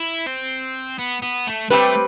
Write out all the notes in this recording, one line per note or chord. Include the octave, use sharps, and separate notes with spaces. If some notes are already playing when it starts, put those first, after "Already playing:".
Already playing: E4
C4
B3
B3
A3
G3 A3 C4 G4 B4